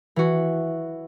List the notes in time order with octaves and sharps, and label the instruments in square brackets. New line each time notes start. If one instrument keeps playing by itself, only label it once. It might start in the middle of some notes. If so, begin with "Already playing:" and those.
[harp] E3 F#4